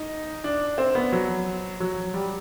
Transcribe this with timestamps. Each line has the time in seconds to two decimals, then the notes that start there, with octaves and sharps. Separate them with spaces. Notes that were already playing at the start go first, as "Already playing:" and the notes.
Already playing: D#4
0.44 D4
0.78 C4
0.95 B3
1.12 F#3
1.80 F#3
2.14 G3